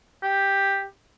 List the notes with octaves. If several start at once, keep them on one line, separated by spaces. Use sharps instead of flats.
G4